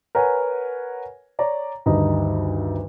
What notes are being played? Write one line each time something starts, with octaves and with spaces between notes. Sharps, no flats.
A#4 B4 C#5 F#5 G#5
C#5 D5 A#5
D2 G2 D#3 G3 D#4 D#5